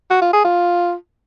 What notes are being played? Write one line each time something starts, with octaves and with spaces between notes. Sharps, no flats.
F#4
F4
G#4
F4